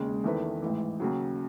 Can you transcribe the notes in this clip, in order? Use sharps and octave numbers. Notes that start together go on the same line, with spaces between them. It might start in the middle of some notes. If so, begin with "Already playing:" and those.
Already playing: E1 D#2 C#3 G#3
E2 D#3 A3 E4 B4
A1 G#2 E3
D#2 C#3 F#3